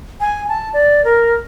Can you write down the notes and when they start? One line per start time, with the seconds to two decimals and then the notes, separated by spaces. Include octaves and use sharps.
0.21 G#5
0.49 A5
0.73 D5
1.05 A#4